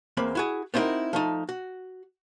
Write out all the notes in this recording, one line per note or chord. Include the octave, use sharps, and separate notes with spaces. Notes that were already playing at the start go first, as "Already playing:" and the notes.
E2 A#3 C4 B5
E4 F#4 G#4
B3 C4 D#4 E4 F#4 A#4
F3 A3 D#4
F#4